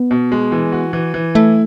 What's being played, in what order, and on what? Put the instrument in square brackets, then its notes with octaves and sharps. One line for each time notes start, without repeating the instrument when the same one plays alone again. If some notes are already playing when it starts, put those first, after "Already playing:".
Already playing: [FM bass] B3
[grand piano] B2
G#3
E3
F#4
E3
E3
[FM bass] A3 [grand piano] E4